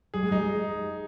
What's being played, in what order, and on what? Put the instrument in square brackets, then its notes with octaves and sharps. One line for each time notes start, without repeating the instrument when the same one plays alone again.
[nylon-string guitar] G3 [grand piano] G#4
[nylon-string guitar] G#3
[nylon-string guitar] G3 [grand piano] D#4
[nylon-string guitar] G#3